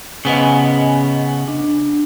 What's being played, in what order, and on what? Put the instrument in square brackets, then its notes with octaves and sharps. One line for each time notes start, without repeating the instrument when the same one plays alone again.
[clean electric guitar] C#3 B3 [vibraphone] D#5 G#5
[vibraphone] D4